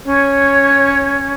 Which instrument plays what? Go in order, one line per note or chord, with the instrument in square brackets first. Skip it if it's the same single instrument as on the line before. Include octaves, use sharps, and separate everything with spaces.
[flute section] C#4 C#5